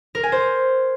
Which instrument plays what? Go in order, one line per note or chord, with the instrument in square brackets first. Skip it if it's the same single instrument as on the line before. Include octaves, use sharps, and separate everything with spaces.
[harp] A#4
G#5
C5